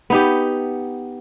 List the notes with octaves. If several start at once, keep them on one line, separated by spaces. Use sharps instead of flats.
B3 D#4 G4